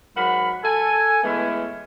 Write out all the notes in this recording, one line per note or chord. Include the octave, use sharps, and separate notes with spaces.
G#2 F#3 A#4 F#5 B5
A4 G#5
E3 G#3 A3 B3 C#4 E4